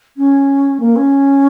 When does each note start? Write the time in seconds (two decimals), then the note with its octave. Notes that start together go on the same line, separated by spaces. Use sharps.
0.16 C#4
0.80 A#3
0.95 C#4